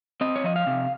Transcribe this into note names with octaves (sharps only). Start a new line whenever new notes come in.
C4 D#5
C#5
F3 D#5
F5
C3